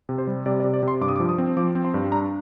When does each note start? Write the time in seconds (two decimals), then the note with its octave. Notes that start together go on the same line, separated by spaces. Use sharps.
0.09 C3
0.18 C5
0.27 G3
0.46 C3 D5
0.60 D5
0.64 C3
0.74 D5
0.83 C3 C6
1.01 G2 D6
1.08 D#6
1.16 D6
1.20 F3
1.29 D#6
1.38 C4
1.57 F3 D6
1.75 C4
1.85 C6
1.94 G2
2.12 D4 A#5